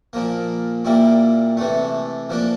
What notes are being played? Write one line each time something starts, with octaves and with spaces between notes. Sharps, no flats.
A#2 F3 A#3
A#2 G3 A#3 E4
C3 E3 A3
F3 A#3 D4